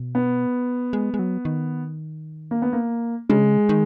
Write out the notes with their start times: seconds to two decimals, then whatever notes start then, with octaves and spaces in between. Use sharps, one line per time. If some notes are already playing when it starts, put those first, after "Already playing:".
Already playing: B2
0.15 B3
0.93 G#3
1.14 G#3
1.19 F#3
1.45 D#3
2.51 A#3
2.62 B3
2.73 A#3
3.29 C#3 G#3
3.69 D#3